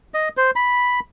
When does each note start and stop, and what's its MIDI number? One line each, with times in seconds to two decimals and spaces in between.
0.14 0.29 75
0.37 0.51 72
0.56 1.00 83